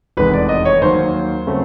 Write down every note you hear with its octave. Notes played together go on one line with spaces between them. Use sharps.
F1 E2 C3 D#3 G#3 B4
D5
D#5
C#5
D#2 D#3 F#3 A#3 C5
C#3 F#3 A3 C4